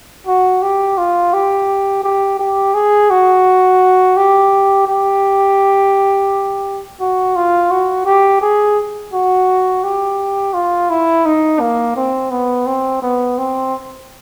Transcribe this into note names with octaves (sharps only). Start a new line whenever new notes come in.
F#4
G4
F4
G4
G4
G4
G#4
F#4
G4
G4
F#4
F4
F#4
G4
G#4
F#4
G4
F4
E4
D#4
A#3
C4
B3
C4
B3
C4